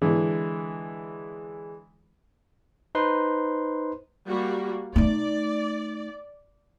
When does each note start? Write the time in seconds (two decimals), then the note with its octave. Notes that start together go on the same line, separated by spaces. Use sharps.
0.02 D3 E3 G#3
2.95 D#4 B4 C5 C6
4.26 G3 A#3 F#4
4.96 A3 D#4 D5